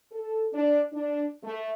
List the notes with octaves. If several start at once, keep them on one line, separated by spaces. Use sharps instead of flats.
A4
D4
D4
A3